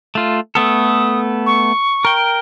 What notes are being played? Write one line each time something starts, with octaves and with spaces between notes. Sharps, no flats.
A3 F4
A3 B3 A4 D#6
C#6
A#4 G5